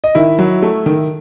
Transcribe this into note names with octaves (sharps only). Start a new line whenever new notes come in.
D#5
D#3 E4 E5
F#3
A3
D#3